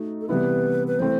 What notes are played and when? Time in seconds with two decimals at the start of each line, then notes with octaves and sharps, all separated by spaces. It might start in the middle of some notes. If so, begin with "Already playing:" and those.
Already playing: A3 D#4 F#4
0.21 A4
0.29 C3 E3 G3 B3 E4 B4
0.87 B4
0.99 E3 A3 C4 C5